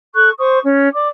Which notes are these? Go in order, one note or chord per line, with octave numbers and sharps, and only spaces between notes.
A4 C#6 F#6
C5 C#6 D#6
C#4
D5 D6